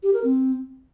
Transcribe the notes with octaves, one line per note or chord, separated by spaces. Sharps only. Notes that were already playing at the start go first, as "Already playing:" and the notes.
G4
A#4
C4